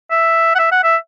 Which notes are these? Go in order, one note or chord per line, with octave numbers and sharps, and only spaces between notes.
E5
F#5
E5
F#5
E5